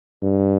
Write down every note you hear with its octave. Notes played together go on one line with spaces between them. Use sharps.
G2